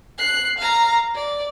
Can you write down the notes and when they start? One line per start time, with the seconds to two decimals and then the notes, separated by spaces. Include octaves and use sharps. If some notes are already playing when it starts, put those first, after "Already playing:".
0.18 F#6 C7
0.59 F5 A#5
1.15 D5